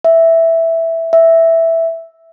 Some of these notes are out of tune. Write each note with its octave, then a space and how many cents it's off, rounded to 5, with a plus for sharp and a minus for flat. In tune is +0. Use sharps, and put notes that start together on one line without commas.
E5 +0
E5 +0